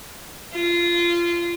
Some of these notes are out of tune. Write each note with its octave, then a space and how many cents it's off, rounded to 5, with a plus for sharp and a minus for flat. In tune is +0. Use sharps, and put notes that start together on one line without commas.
F4 -20